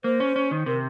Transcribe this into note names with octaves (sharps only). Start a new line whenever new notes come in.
A#3 C5
C#4
C#4
D#3
C3 A#4